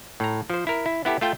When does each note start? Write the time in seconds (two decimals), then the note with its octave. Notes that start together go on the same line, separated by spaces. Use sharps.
0.20 A2 A#5
0.50 F3 C5
0.67 E4 A#4
0.86 E4
1.05 B3 E4 G4 A4
1.21 A3 F4 G5